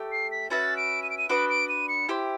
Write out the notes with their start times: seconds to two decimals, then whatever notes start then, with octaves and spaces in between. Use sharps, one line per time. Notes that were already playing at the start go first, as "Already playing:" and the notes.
Already playing: A3 G4
0.12 C7
0.31 B6
0.50 C#4 F#4 B4 E5 A6
0.77 D7
1.03 D#7
1.10 D7
1.18 D#7
1.29 D4 F#4 B4 D#5 D7
1.50 D7
1.69 D#7
1.89 C#7
2.08 E4 G4 C5